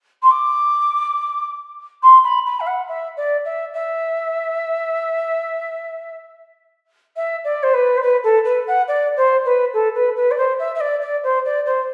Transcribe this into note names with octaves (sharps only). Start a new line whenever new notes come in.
C6
D6
C6
B5
B5
E5
F#5
E5
D5
E5
E5
E5
D5
C5
B4
C5
B4
A4
B4
F#5
D5
C5
B4
A4
B4
B4
D5
C5
E5
E5
D5
D5
C5
D5
C5